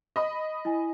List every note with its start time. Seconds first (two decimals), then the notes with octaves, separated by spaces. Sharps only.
0.16 D#5 B5 D#6
0.65 E4 G#5